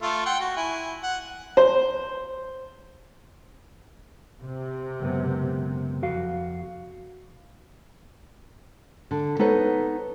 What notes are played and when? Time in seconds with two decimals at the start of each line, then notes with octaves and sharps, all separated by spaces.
0.02 A3 F4 A4
0.26 F#5 G5 C6
0.40 F#4
0.56 E4 G#5
1.03 F#5
1.57 C5
4.42 C3
5.00 C#2 F#2 B3
6.02 F2 F#4 F5
9.11 D3
9.39 B3 D#4 A4 B4 C#5